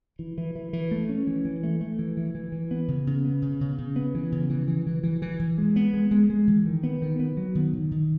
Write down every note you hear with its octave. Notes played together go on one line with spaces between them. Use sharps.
E3
E3
E3
E3
A3
C#4
E3
E3
A3
A3
E3
E3
E3
E3
B3
C#3
C#3
B3
C#3
C#3
C#3
B3
E3
C#3
E3
E3
E3
E3
E3
E3
G#3
B3
G#3
G#3
G#3
E3
D#3
B3
D#3
B3
F#3
D#3
D#3
D#3